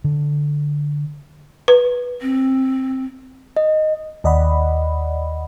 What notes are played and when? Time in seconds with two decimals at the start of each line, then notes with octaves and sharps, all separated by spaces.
0.04 D3
1.68 B4
2.22 C4
3.57 D#5
4.24 D#2 D5 D#5 F#5 B5